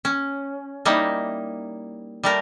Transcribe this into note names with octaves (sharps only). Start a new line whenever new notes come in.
C#4
G3 A#3 D#4 E4
G3 A3 A#4